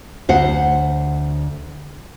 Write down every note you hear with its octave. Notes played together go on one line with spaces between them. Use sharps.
D2 C5 F#5